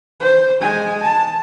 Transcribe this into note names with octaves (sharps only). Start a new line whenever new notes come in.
C5
G#3 G#5
A5